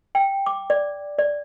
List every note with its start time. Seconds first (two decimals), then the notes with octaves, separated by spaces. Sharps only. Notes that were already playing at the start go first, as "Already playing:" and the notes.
0.15 G5
0.46 D6
0.70 D5
1.19 D5